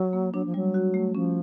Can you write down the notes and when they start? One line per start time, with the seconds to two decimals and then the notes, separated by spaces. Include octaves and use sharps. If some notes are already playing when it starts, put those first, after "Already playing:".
Already playing: F#3
0.13 A#3
0.33 F#3 D4
0.45 F3
0.54 F#3 G3
0.74 F#4
0.94 A3
1.15 F3 C#4